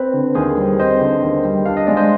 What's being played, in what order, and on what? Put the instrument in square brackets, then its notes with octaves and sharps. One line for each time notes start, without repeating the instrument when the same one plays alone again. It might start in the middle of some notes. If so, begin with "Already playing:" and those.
Already playing: [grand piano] C4 [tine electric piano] B4
[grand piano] D3
[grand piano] D#2 [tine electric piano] G#4 C5
[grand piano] G3
[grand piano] C4 [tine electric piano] C5 D#5
[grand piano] D3
D#2
G3
[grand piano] D4 [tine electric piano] F5
[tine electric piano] D#5
[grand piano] G#3 [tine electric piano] D5
[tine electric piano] C5 D#5